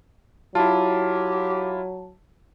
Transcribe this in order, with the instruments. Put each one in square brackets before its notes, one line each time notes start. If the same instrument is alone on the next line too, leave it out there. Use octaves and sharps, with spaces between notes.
[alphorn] F#3 [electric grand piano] E4 F4 [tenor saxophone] G4 [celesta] A5